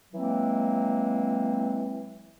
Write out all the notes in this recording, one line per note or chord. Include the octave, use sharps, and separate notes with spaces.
E3 F#3 G#3 A#3 C4